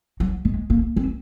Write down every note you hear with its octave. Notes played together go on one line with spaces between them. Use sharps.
F#3
G#3
A#3
C4